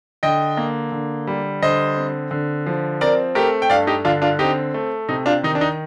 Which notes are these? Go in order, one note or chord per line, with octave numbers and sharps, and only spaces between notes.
D3 D#5 G5
A#3
D3
G3
D3 C5 D#5
C4
D3
F3
C4 A#4 D5
A3 G4 A#4
G5
G2 D5 F5
D#4 G4
D3 D4 F4
D4 F4
C4 D#4 G4
A3
C3 D#4
D4 F4
D#3 D#4
D4
D#4